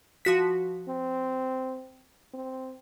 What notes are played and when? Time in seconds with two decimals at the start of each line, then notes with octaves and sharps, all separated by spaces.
0.25 F3 F#4 B6
0.88 C4
2.33 C4